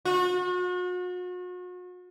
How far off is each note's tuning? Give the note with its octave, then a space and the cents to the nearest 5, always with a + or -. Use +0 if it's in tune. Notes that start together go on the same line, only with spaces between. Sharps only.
F#4 -40